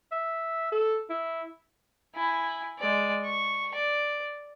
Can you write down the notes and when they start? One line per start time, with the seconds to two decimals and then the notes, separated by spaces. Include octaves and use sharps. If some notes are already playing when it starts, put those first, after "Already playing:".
0.12 E5
0.72 A4
1.10 E4
2.16 E4 G#5
2.79 G#3 D5
3.25 C#6
3.75 D5